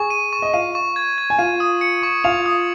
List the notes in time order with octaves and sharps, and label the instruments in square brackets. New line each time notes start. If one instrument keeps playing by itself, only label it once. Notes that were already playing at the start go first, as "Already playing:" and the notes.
Already playing: [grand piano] G#4 G#5 [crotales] C#6
[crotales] D#7
C#6
[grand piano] D#5
[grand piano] F4 F5 [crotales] D#7
[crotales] C#6
G#6
G#6
[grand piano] G#5
[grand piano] F4 F5 [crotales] D#7
[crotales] D#6
C#7
C#6
[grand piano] F4 F5 [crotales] F7
[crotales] D#6